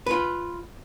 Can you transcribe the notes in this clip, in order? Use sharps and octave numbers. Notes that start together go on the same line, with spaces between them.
F4 B4